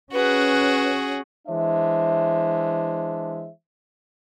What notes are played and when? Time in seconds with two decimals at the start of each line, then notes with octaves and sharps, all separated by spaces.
0.13 C#4 F#4 G#4 B4
1.48 E3 G#3 D4 C5 E5